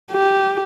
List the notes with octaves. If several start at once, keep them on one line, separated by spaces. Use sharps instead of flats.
G4